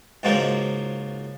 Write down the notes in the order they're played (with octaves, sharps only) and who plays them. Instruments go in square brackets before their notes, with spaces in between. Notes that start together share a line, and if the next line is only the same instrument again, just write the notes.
[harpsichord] C#2 G#2 F3 F#3 A#3